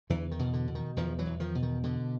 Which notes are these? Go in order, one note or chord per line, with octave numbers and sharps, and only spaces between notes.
E2 D3 E3
D#3
B2
D3
B2
D#3
E2 D#3 F3
E3 F#3
E2
D#3 F3
B2
D#3
B2 D3